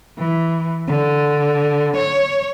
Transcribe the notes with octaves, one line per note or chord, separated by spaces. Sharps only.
E3
D3
C#5